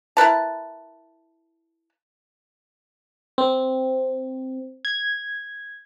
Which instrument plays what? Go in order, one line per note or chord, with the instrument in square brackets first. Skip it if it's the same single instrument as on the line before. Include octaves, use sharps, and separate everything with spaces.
[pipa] E4 A#4 B4 A5
[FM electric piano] C4
G#6